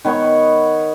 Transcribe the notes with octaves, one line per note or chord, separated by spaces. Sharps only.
D#3 B3 C#5 C#6